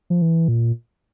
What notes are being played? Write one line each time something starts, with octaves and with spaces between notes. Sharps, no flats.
F3
E3
A#2